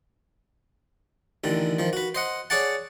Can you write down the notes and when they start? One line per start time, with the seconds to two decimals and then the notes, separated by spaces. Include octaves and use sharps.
1.44 A1 D3 D#3
1.79 D#3 F3
1.93 F#4 B4
2.15 C5 D#5 F#5
2.50 G#4 C#5 D5 F#5 A5